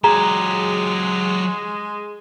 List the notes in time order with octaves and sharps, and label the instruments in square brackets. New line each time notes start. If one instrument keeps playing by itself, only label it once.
[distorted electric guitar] F#3 G4 [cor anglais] G#3 [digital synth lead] G#4 [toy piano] A#5